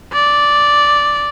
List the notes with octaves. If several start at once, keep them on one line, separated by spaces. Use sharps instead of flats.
D5